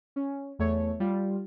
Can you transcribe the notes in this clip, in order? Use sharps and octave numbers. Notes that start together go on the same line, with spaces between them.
C#4
E2 A3 C#5
G3 F4